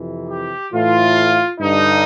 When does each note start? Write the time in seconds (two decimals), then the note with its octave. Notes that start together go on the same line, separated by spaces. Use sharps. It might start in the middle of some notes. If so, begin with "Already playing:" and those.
Already playing: F2 C3 E3
0.28 G4
0.72 A2 E3 F4
1.59 G2 D3 D#4